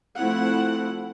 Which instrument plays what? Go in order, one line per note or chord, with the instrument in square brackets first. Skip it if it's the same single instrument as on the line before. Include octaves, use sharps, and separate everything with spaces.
[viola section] F3 A3 C4 E4 F#5